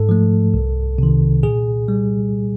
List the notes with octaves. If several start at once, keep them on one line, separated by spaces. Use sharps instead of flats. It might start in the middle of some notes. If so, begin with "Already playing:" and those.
Already playing: G#2 A4
F3 A3
C2
C3 D#3
A#2 G#4
G3